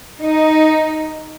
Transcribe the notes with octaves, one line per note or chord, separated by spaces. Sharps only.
D#4